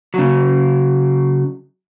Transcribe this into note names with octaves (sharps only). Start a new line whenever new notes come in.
C#3 F#3